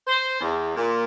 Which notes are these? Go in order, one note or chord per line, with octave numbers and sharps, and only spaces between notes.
C5
E2
A#2